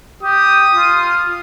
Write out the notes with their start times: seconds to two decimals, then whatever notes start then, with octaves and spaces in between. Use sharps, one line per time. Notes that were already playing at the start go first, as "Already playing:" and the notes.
0.23 G4 D#6
0.75 F4